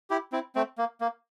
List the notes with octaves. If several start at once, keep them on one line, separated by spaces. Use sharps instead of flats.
E4 G4
C4 E4
A3 C4
A#3
A#3